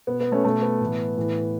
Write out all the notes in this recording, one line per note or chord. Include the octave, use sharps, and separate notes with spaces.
B2 B3
B3
A3 C#4
B2 A3
B3
A2 E3
A2 E3